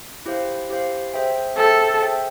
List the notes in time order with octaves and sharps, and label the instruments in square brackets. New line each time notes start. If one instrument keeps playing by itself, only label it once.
[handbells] E4 G4 C5 F5
E4 G4 C5 F5
G#4 C5 E5 G5
[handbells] G#4 C5 E5 G5 [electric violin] A4
[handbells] G#4 C5 E5 G5